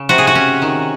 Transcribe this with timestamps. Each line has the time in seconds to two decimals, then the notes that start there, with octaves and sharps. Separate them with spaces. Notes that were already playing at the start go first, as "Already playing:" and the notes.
Already playing: C#3
0.09 C3 F#4
0.18 G#4
0.27 F#4
0.35 C#4
0.62 D#3